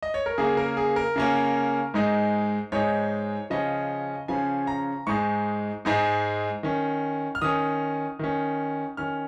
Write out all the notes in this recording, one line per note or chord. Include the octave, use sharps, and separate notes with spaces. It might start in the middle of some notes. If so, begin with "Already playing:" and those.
D#5
C#5
A#4
C#3 A#3 C#4 G#4
A#4
G#4
A#4
C#3 A#3 C#4
G#2 G#3 D#4
G#2 G#3 D#4 C#5
C#3 F3 C#4 D#5
C#3 F3 C#4 G#5
A#5
G#2 G#3 D#4 C#6
G#2 G#3 D#4
D#3 C#4
F6
D#3 C#4 D#6
D#3 C#4
D#3 C#4 F6